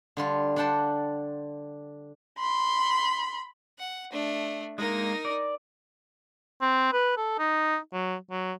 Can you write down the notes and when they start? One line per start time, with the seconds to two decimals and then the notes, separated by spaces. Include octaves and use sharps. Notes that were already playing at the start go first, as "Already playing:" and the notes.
0.17 D3 G3 F4
0.56 D4 D5 F#5 G5 A5 C6
2.38 B5 C6
3.79 F#5
4.12 A3 D4
4.78 G#3 A#3 D#4 A#4
5.25 D5
6.61 C4
6.93 B4
7.17 A4
7.39 D#4
7.93 F#3
8.31 F#3